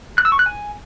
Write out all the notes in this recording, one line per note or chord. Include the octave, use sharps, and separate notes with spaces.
F#6
E6
C#6
F#6
G#5